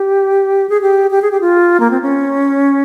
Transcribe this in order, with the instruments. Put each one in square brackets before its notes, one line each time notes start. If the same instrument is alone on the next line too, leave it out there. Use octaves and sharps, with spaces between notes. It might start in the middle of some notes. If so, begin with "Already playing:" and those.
Already playing: [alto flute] G4
G#4
G4
G4
G#4
G4
F4
A#3
C4
C#4